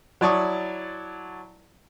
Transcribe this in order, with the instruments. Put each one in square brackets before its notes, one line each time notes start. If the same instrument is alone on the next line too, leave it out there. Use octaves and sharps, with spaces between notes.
[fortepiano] F#3 E4 D5 A5 C#6 D#6